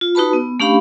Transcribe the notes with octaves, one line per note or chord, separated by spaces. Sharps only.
F4
D#4 F#4 B4 A5 B5
B3
A3 C#4 D4 G4 F5 B5